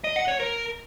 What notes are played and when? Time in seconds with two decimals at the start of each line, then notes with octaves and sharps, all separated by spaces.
0.04 D#5
0.16 F#5
0.28 C#5
0.40 A#4